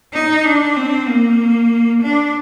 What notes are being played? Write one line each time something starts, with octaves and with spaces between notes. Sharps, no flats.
D#4
D4
C4
A#3
D4